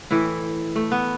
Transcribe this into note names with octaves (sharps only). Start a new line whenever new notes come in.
A2 E3 E4
A3
B3